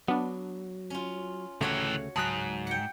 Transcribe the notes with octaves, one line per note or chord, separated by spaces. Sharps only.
F#3 B3 D4
C#4 F4
D2 A2 C#3 E3 A3 F#4 C#5 F5
C#2 G#2 F#3 A5 D#6 F#6
F#5 G5 C#7